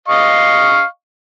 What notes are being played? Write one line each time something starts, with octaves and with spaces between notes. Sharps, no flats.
D#5 F5 C#6